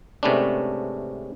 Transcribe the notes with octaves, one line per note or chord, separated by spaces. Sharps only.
G#2 C3 A3 B3 C#4 D4